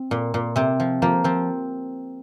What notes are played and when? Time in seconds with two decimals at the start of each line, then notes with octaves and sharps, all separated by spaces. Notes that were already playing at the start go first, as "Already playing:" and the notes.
Already playing: C4
0.11 A#2
0.34 A#2
0.56 C3 C4
0.80 F3
1.02 F3 A#3
1.24 F3 C4